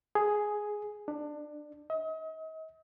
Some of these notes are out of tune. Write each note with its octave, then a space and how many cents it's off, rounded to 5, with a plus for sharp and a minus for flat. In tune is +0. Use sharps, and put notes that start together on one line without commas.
G#4 +5
D4 +20
D#5 +40